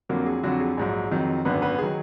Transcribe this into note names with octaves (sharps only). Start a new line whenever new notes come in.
F2 D3 F#3 A#3 A#4
G#4
F2 D3 F#3 F#4
G#4
A#1 G#2 F#3
F2 D#3 F#3
G#1 F#2 D3 B3 B4
B3 B4
D#3 F#3 G#4